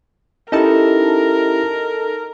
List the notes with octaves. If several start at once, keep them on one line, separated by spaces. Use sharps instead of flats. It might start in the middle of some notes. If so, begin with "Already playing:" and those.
C#4 D#4 E4 G4 A4 A#4